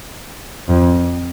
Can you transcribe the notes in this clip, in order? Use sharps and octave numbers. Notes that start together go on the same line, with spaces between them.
F2